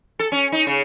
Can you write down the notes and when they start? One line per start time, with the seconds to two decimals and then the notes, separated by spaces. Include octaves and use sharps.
0.19 A4
0.32 C#4
0.52 D#4
0.67 C#3